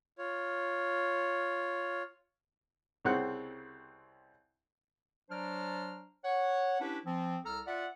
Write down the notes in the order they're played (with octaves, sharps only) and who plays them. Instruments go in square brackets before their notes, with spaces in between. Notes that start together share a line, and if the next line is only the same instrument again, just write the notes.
[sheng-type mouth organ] F4 C#5
[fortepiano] C2 C#3 C4 F#5
[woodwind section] F#3 D4 C5 D5 A#5 F6
C#5 F#5
C#4 D4 E4 G4 B4
F3 C4
C2 A4 A#5 F6
F4 D5 E5 F#5